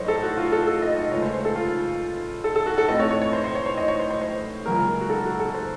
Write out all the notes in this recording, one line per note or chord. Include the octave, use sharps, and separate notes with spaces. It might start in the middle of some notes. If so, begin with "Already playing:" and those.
Already playing: A2 F#3 A3 C5 C#5 D#5
A4
F#4
F4
A4
A4
D#5
D#5
C#2 C#3 A3 C#5
C5
C5
A4
F4
A4
A4
F#4
A4
A2 A3 C4 D#5
C#5
C#5
C#5
C5
C5
C#5
C#5
D#5
C#5
C5
C5
C5
C#2 C#3 F#3 A#3 A#4
F#4
A4
F#4
A4
C5